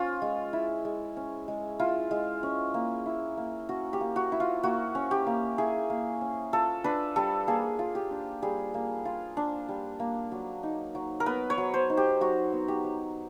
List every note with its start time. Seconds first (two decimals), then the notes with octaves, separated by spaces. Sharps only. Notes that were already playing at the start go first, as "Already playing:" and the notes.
Already playing: C#4 F4
0.22 G#3
0.53 E4
0.85 G#3
1.17 C#4
1.48 G#3
1.79 E4 F4
2.11 G#3
2.43 C#4
2.74 A#3
3.06 E4
3.37 A#3
3.69 C#4 F#4
3.93 G4
4.01 A#3
4.16 F#4
4.32 E4
4.40 F4
4.63 A#3 F#4
4.95 C#4
5.11 G4
5.27 A#3
5.58 E4 G#4
5.90 A#3
6.21 C#4
6.53 F4 A4
6.84 D4 B4
7.16 G3 A4
7.47 A#3 G#4
7.79 F4
7.95 G4
8.11 D4
8.42 G3 G#4
8.74 A#3
9.05 F4
9.37 D4
9.68 G3
10.00 A#3
10.32 F#3
10.63 D#4
10.95 F#3
11.20 A#4
11.26 B3 B4
11.50 C#5
11.58 F#3
11.74 C5
11.90 D#4
11.97 G4
12.21 F#3 F#4
12.52 B3
12.68 G4
12.84 F#3